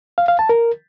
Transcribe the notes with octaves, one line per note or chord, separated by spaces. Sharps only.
F5
F5
A5
A#4